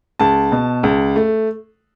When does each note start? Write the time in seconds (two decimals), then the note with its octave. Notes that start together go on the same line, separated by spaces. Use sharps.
0.19 C#2 A5
0.52 B2
0.83 C#2
1.16 A3